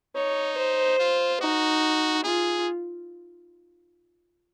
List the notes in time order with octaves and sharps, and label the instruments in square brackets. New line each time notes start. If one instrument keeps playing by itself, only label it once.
[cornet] D#4 [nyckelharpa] C#5
[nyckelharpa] C5
[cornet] F4
[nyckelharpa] D#4 [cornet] F#4
[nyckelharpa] F4 [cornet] G#4